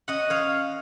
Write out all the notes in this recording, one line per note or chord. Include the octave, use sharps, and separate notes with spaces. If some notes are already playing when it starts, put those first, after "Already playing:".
C#4 D#5 F#5
C#5 F5